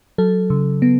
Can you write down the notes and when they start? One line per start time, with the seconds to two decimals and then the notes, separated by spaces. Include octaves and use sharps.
0.18 F#3 A4
0.50 C#3
0.82 B3